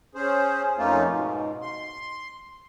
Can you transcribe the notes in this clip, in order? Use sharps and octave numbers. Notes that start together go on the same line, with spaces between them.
C#4 G#4 C5
F2 A3 A#3 C#4 D#4 F4
G#2 B2
C6